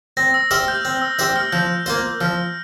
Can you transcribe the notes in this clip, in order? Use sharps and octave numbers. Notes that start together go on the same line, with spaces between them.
C4 A#6
E6
G4 C5 E5 F6
G6
C4
E6
G4 C5 E5
F6
F3 G6
A#3 F4 C5
F3 F6